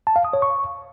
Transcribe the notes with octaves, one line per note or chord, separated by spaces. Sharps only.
A5
F5
D#6
C#5
C#6